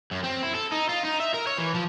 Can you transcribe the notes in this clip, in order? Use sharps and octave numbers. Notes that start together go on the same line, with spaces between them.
F#2
C4
E4
A4
D#4
F4
D#4
E5
A#4
C#5
E3
F3